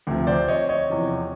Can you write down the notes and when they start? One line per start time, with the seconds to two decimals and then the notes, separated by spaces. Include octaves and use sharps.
0.07 D2 C3 F3
0.27 C5 D5
0.48 C#5 D#5
0.69 C#5 D#5
0.90 E2 C3 F3